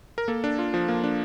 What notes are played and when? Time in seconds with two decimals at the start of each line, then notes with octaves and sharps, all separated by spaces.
0.18 A#4
0.28 A#3 A4
0.44 D4
0.59 F4
0.74 F3
0.88 A#3
1.04 D4